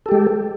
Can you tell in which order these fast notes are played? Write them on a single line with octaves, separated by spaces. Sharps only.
A4 G4 G#3